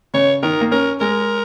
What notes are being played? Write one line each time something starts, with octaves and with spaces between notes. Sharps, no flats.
C#3 C#5
D#3 A#4
A#3
C#4 A#4
G#3 A#4